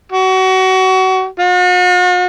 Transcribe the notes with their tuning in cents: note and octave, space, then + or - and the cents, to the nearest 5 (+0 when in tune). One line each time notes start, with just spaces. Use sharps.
F#4 +25
F#4 -45